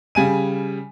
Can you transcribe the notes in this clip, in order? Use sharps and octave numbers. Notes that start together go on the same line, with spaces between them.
C#3 G3 G#5 D#7